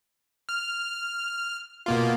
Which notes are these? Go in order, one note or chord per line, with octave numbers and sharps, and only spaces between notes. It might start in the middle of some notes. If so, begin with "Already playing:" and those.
F6
B2 A#3 F4